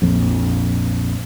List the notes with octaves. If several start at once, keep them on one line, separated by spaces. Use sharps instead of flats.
A#1 F2